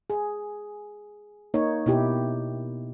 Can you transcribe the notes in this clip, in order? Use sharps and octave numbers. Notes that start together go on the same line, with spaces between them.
G#4
A#3 D#4 C#5
B2 E4 G4